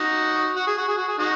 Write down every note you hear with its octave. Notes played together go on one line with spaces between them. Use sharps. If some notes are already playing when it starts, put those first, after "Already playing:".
Already playing: D#4 F#4
F#4
G#4
F#4
G#4
F#4
G#4
D#4 F#4